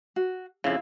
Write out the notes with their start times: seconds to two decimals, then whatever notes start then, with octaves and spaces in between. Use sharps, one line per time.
0.16 F#4
0.64 F2 C#3 E4 F5